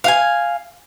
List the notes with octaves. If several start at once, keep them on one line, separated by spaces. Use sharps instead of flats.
F5 F#5 G#5